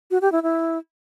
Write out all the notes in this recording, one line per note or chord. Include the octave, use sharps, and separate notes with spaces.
F#4
G4
E4
E4